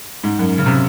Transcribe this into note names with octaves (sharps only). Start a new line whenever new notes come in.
G#2
F#2
C#3
C3